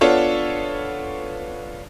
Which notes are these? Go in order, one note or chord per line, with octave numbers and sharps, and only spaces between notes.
B3 D4 F4 A4 C#5